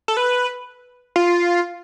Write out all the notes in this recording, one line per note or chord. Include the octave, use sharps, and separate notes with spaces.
A4
B4
F4